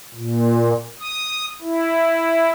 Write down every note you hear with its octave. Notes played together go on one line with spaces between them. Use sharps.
A#2
D#6
E4